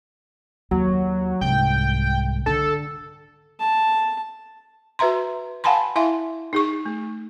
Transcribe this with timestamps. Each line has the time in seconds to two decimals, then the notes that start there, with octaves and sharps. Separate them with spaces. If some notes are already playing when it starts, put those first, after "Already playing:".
0.71 D#2 F#3
1.41 C2 G#2 G5
2.46 D3 A4
3.59 A5
4.99 F#4 B4 E5 A#5 C6
5.64 F5 F#5 G#5 A5 B5 C6
5.96 E4 E5 F5 G#5 C6
6.53 D#4 G#4 C#6
6.85 A3